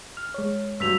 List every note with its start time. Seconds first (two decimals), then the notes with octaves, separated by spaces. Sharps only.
0.17 F6
0.34 G#3 C#5
0.80 G2 F#3 E6 B6 F7